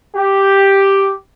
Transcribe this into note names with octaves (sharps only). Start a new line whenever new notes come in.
G4